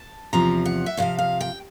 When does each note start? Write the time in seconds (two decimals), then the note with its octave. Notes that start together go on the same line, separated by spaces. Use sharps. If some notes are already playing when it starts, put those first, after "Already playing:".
Already playing: A5
0.33 E2 C3 F3 A#5
0.66 F#5
0.86 E5
0.97 E2 C3 F3 F5
1.19 F5
1.41 G5